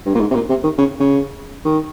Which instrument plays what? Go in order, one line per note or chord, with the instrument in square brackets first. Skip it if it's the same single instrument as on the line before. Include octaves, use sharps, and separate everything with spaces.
[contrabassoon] G2
A#2
G#2
C3
A#2
C3
D#3
C#3
C#3
D#3